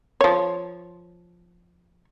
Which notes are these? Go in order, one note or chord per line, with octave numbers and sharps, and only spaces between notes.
F3 C#5